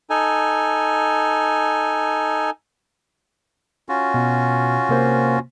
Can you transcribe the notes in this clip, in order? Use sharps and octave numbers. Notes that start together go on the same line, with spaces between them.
D#4 A4 G#5
C#4 F4 F#4
B2
C3 A#3 C5